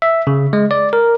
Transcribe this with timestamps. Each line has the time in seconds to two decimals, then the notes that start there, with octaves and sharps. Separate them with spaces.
0.02 E5
0.27 C#3
0.53 G#3
0.71 D5
0.93 A#4